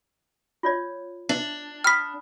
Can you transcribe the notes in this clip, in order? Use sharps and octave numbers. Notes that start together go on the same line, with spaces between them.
F4 C#5 D5
D4
G5 B5 D#6 F6 B6